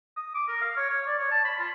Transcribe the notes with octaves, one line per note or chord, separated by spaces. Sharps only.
D#6
D6
A#4
F5
C#5
C#5
D5
C#5
A5
B5
F4